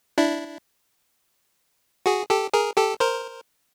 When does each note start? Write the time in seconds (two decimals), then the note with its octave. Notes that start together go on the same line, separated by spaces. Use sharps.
0.18 D4 E4
2.06 F#4 G#4
2.30 G4 A4
2.54 G#4 A#4
2.77 G4 A4
3.00 A#4 C5